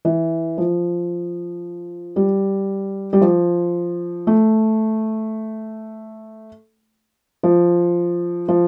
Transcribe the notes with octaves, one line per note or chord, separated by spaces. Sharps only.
E3
F3
G3
G3
F3
A3
F3
F3